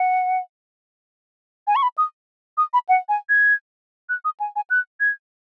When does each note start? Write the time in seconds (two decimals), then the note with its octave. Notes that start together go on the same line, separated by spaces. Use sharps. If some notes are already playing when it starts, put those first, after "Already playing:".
Already playing: F#5
1.67 G#5
1.76 C#6
1.83 B5
1.98 D#6
2.58 D#6
2.73 B5
2.89 F#5
3.09 G#5
3.29 G#6
4.09 F#6
4.25 D#6
4.40 G#5
4.56 G#5
4.70 F#6
5.00 G#6